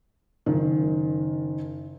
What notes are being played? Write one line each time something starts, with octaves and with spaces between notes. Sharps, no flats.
F#1 D#3